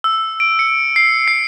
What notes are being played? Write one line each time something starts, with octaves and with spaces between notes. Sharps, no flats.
E6
D7
C#7
C7
C7